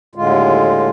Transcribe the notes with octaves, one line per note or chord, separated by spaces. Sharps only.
D#2 A2 D3 G#3 F4